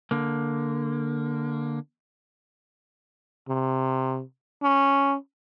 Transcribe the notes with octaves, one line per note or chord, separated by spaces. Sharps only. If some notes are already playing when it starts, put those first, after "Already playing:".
D3 A#3
C3
C#4